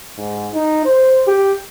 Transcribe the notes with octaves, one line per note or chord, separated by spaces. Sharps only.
G#2
D#4
C5
G4